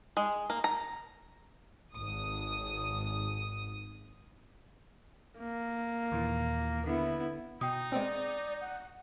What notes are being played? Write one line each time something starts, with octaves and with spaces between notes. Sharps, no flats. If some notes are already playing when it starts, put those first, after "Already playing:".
G#3
A#3
A#5
G#1 D#6
A#3
D#2 A#2 E3
D3 B3 E4
B2 D#4 G5 D#6
G#3 B3 C4 D5
F#5